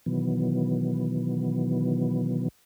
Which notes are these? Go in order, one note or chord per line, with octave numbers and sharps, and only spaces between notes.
B2 D#3 E3 F#3 B3